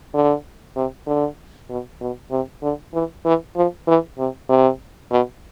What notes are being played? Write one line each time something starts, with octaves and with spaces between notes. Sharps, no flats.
D3
C3
D3
B2
B2
C3
D3
E3
E3
F3
E3
C3
C3
B2